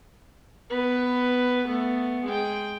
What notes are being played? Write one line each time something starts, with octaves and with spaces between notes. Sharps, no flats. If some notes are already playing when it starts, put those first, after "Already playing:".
B3 B4
A3 B3
G#3 G5